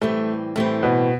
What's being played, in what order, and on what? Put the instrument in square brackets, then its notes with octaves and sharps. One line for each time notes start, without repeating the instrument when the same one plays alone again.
[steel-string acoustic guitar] A2 E3 G3 C4 [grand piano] A3
[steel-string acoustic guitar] A2 E3 G3 C4 [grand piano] A3
[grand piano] B2 B3